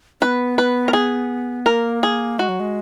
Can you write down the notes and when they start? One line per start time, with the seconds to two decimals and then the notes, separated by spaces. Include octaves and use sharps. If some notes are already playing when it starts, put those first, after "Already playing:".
0.21 B3 C#4 B4
0.58 B4
0.88 A#4
0.93 G#4
1.66 A#3 A#4
2.03 G#4
2.39 G#3 F#4
2.49 F#3
2.60 G#3